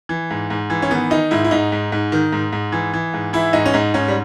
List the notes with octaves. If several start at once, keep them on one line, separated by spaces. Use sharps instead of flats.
E3
G#2
G#2
E3
C#4
D#3 B3
D#3 D#4
G#2 E4
E4
G#2 D#4
G#2
G#2
D#3
G#2
G#2
E3
E3
G#2
E3 E4
G#2 D#4
C#4
G#2 D#4
G#2 C#4
G3